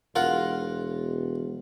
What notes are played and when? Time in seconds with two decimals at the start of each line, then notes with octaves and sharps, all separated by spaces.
0.16 E1 F4 A#4 F#5